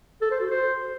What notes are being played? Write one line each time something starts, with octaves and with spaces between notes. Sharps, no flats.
A4
C5
F#4
C5